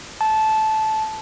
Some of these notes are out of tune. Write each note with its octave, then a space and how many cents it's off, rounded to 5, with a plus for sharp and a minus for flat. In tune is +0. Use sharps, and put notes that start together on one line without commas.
A5 -15